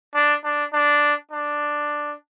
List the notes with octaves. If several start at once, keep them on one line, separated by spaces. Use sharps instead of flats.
D4
D4
D4
D4